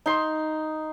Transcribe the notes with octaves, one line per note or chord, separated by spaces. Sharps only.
D#4 C6